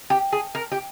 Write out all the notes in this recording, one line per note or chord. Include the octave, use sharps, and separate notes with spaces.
G4
G#4
A#4
G4